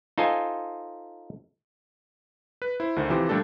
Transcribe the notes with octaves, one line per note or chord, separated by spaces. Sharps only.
D#4 F4 A4 C5 D#5 G#5
B4
E4 C5
D2 D3 D#3 C5
C3 E3 F3 G4 C5
A#2 G3 A3 D4 A4